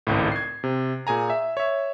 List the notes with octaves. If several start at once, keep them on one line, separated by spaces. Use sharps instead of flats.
G#1 C#2 A2
G#6 C7
C3
A#2 G#4 G#5 A#5
E5
C#5 E5